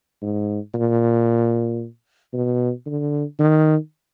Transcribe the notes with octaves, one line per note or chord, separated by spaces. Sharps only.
G#2
A#2
B2
D3
D#3